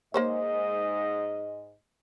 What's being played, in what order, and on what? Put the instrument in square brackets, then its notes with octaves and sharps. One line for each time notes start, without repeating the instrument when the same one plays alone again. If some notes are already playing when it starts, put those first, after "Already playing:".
[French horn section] G#2 D#5 [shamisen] A#3 C5 C#5